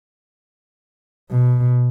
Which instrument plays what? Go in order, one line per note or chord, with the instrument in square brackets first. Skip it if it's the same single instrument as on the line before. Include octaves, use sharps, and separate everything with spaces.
[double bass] B2